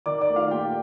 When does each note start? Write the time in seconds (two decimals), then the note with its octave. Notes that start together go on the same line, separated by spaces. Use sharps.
0.06 D#3 D5 D6
0.21 D5 D6
0.29 A3
0.36 F4 F5
0.51 A#2 G4 G5